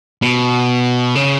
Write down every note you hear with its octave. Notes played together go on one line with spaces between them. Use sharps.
B2
C#3